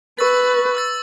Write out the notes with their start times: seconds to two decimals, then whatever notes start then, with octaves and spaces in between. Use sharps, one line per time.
0.19 B4 C#6 E6 A6
0.75 C#6 E6 A6